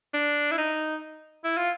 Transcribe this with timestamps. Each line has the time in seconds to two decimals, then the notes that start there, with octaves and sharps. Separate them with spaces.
0.14 D4
0.51 E4
0.57 D#4
1.44 E4
1.57 F4